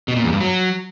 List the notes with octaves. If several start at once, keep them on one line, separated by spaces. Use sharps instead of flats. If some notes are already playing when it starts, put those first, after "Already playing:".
B2
A#2
E2
G2
F#3